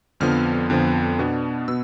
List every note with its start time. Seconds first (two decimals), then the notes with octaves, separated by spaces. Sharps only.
0.20 F2 D3 F3 B3 F6
0.70 F2 D3 F3 B3
1.19 B2 B3 D4
1.68 B2 B3 E6